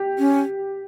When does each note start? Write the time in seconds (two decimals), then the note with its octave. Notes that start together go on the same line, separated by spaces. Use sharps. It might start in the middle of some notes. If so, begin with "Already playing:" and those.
Already playing: G4
0.19 C#4